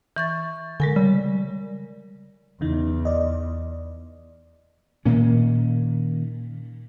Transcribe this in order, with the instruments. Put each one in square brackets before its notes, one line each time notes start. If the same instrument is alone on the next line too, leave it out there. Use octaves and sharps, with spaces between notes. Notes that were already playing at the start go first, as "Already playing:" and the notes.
[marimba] E3 C#6 A6
[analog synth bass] D3 [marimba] G#3 A#4 G#5
[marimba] C#3 [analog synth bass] G3
[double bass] E2 [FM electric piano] C#3 E3 D#4
[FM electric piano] D5 D#5
[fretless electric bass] A#2 [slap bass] D#3 A#3 C#4